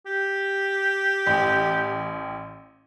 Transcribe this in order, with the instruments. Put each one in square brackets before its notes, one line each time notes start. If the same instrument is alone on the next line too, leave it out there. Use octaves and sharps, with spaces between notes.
[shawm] G4
[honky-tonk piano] A1 G5